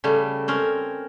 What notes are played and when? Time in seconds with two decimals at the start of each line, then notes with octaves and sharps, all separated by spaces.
0.04 C#3 G3 A3
0.48 C4 C#4 A#4